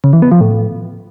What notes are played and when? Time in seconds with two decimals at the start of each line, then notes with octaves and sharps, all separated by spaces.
0.04 C#3
0.13 E3
0.22 B3
0.31 F3
0.41 A2